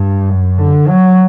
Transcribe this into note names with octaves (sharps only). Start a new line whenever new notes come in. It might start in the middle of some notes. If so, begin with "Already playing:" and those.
Already playing: G2
F#2
D3
F#3